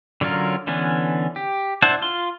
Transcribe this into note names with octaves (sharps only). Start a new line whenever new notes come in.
D3 F#3 C#4 F4 A#4
D3 E3 B3 C#4 D4
G4
D4 E4 C5 F#5 A5
F4 C6